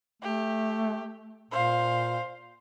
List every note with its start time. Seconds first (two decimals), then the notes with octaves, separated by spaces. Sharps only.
0.22 A3 G4
1.51 A#2 C5 F5